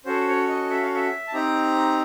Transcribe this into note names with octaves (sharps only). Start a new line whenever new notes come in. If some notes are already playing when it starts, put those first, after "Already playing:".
C#4 F#4 A4 C5
C#5
D#5
E5
F5
E5
A5
C4 D#4 G4 A#5